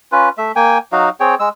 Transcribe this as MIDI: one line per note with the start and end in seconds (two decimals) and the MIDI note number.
0.12 0.29 61
0.12 0.29 65
0.12 0.29 71
0.38 0.52 57
0.38 0.52 76
0.56 0.78 58
0.56 0.78 79
0.56 0.78 80
0.92 1.09 54
0.92 1.09 63
0.92 1.09 66
0.92 1.09 77
1.20 1.35 60
1.20 1.35 68
1.20 1.35 73
1.20 1.35 79
1.39 1.49 56
1.39 1.49 88